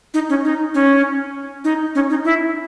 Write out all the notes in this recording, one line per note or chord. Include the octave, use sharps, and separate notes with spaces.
D#4
C#4
D#4
C#4
D#4
C#4
D#4
E4